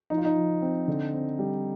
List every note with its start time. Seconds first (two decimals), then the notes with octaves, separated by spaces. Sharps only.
0.10 F3 D#4
0.18 F4
0.25 D#4
0.36 F3
0.62 C4
0.88 D3
1.14 C4
1.39 G3